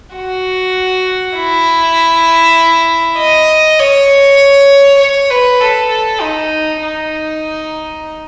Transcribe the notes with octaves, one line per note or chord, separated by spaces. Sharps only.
F#4
E4
D#5
C#5
C#5
B4
A4
A4
D#4
D#4